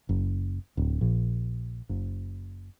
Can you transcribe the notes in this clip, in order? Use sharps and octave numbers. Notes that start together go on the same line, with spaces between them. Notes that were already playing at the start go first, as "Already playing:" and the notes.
F#1
D1
A#1
F#1